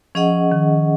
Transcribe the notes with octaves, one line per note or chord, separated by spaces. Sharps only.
F3 C#4 G#4 D#5 F#5
D#3